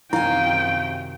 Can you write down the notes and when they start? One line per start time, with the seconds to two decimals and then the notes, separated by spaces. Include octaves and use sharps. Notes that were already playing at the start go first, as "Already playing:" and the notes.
0.13 F#2 C3 D#3 E4 F5 G5 G#5